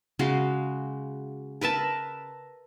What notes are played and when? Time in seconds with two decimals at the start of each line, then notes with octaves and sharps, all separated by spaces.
0.19 C#3 G#3 F#4 F5
1.61 A#4 B4 E5 A5